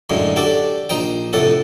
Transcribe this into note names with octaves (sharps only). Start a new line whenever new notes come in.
F#2 A2 D3 G#3
D4 F#4 G4 A4
A#1 D#4 C5 G5
F2 A2 C3 A4 F#5